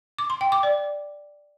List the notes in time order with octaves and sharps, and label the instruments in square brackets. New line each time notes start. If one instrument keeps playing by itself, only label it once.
[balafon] D6
C6
G5
D6
D5